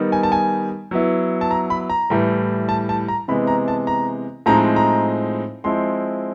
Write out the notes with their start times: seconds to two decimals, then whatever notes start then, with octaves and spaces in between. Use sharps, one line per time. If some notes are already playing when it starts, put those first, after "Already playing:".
Already playing: D#3 G3 B3 D#4
0.12 G#5
0.23 A5
0.32 G#5
0.91 F#3 B3 E4
1.41 A5
1.51 A#5
1.70 B5
1.90 A#5
2.10 A2 E3 G3
2.69 A5
2.89 A5
3.08 A#5
3.28 C3 E3 G#3 B3 B5
3.47 A#5
3.68 A5
3.87 A#5
4.46 A2 F3 G#3 C4 D#4 A#5
4.76 A#5
5.64 F3 G#3 C4 E4 C6